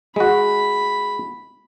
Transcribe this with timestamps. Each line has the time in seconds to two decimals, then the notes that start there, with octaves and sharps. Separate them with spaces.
0.16 G#3 F#4 B5